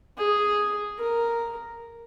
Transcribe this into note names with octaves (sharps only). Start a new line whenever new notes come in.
G#4
A#4